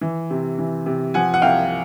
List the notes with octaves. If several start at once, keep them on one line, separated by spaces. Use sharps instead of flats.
E3
C3
E3
C3
F3 F#5 G#5
F#5
C2 F5 G5